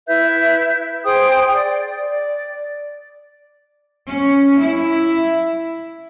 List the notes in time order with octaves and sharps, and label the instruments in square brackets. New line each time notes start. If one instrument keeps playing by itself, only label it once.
[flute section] E4 B4 E5 G6
G#4 C5 G5 D#6
D5
D5
[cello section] C#4
E4